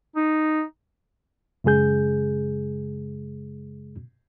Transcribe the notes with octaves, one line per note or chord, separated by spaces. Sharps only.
D#4
F#2 C#3 G#3 G#4 G6